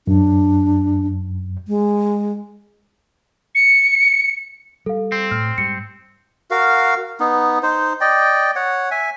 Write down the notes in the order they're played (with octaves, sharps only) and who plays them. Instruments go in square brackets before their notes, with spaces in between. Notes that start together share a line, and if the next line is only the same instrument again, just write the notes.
[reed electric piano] F#2 [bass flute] D4
[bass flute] G#3
[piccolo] C#7
[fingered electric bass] G3 [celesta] A4 F5
[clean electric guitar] C4
[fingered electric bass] A2 [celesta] F6
[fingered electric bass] G#2 G3 [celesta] C#7
[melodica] F#4 A#4 F5
B3 D#4
D#4 C5
D5 D#5 G5
C#5 F#5
E5 G#5